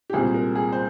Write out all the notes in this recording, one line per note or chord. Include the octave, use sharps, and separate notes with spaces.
G4
C2 A#2 G#3 C4 G#4
A#4
G#4
C5